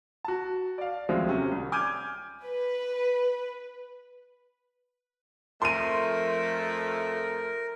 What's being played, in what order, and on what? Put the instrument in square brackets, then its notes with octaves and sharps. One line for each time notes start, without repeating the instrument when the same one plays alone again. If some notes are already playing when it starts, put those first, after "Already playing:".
[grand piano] F#4 A5
D5 F5
D#2 F3 F#3 G#3 A3 C4
C3 C#4
C2
G#5 D6 F6 G6 G#6 D#7
[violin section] B4
[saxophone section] F2 F3 A3 [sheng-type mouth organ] A#4 [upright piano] C6 D#7